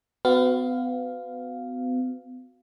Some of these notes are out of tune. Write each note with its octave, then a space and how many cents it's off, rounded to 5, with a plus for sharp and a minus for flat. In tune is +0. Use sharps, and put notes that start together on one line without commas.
B3 +35 F#4 +0 F5 +0